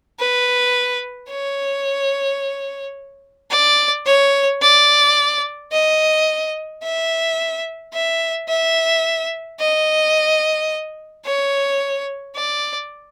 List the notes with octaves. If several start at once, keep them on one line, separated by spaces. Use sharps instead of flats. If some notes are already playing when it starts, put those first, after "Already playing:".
B4
C#5
D5
C#5
D5
D#5
E5
E5
E5
D#5
C#5
D5